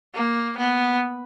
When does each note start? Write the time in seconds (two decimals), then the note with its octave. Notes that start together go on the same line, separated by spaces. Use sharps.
0.14 A#3
0.57 B3